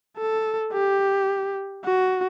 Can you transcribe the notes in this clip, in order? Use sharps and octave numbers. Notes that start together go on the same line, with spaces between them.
A4
G4
F#4